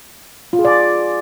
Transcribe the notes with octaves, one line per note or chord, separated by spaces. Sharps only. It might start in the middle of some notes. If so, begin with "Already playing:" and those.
F4
G#4
D5